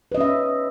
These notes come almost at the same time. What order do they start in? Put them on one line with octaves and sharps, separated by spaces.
B4 D#5 C#4 E5